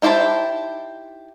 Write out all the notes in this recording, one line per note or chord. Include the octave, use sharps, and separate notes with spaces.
D#4 E4 G4 C5 A5